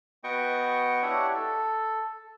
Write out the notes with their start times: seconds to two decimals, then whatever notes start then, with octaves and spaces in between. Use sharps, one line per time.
0.24 B3 F#4 D#5 G5 C#6
1.03 D4 E4 G4 C#5 E5 F#5
1.34 A4